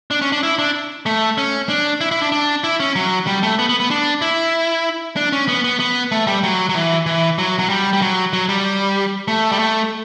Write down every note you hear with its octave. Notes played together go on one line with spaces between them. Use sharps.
D4
C#4
D4
E4
D4
A3
C#4
D4
E4
E4
D4
D4
E4
C#4
F#3
G3
A3
B3
B3
B3
D4
E4
D4
C#4
B3
B3
B3
A3
G3
F#3
F#3
E3
E3
F#3
F#3
G3
G3
F#3
F#3
G3
A3
G3
A3